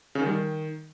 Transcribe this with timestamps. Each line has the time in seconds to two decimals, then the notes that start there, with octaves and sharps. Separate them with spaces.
0.15 C#3
0.21 D#3
0.26 G3
0.31 D#3